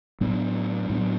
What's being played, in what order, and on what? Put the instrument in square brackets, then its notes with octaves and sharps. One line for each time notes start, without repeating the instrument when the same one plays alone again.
[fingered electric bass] A2 F#3 B3 D4
A2 F#3 B3 D4